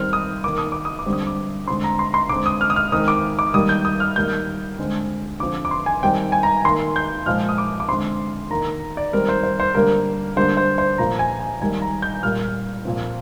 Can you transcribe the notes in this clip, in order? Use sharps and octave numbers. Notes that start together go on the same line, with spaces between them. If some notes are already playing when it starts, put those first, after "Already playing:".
Already playing: D#3 G3 C4 F6
D#6
D#3 A#3 D6
D#6
D6
D#6
D6
D3 G3 C4
D#6
D6
D3 G#3 C4 C6
A#5
C6
C6
D3 G#3 C4 D6
D#6
F6
D#6
F6
D#3 G#3 C4 D#6
D6
D6
D#3 G3 A#3 D#6
G6
D#6
F6
D#3 G3 A#3 G6
D3 G#3 C4
D3 F3 C4 D6
D6
C6
G#5
D#3 G3 C4 G5
G#5
A#5
D#3 A#3 C6
G6
A#2 F3 G#3 F6
D#6
D6
D6
D3 G#3 C4 C6
D#3 A#3 A#5
D5
D#3 G3 C4 A#4
C5
C5
C5
D3 G3 A#3 A#4
D3 G3 A#3 C5
C5
C5
A#2 F3 A#3 A#5
G#5
G#5
D#3 G3 A#3 G#5
A#5
G6
A#2 G3 A#3 F6
A#2 F3 C4